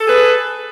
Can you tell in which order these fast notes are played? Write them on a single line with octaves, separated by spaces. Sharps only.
A4 G#4 B4